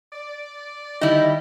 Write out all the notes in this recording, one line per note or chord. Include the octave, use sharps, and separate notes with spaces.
D5
D3 D#3 G3 D#4 E4 D#5